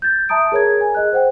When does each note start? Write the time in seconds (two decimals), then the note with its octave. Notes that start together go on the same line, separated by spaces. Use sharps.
0.02 G6 A6
0.29 E5 A5 A#5 D#6 D7
0.52 G#4 A#4 C#5 A#5 G#6
0.81 G#5
0.94 G#4 D#5 F#6
1.12 C5 F#5 G5